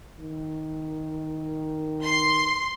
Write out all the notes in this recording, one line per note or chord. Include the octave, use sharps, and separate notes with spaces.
D#3
C6